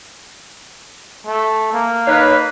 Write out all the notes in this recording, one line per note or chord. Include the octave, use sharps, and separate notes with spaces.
A3
A#3
D#4 B4 C#5 F5